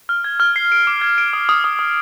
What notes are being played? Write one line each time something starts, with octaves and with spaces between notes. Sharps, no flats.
F6
G#6
F6
C7
D7
D6
G#6
D7
D#6
D#6
D#6
D#6